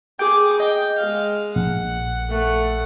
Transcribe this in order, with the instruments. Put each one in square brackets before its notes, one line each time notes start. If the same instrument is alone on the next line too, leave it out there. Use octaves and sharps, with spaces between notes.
[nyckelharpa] G#4 D6 [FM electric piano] G5
[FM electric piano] D#5 [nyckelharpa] G5
[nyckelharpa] G#3 F5
[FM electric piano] A#1 [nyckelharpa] F#5
[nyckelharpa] A3 F#5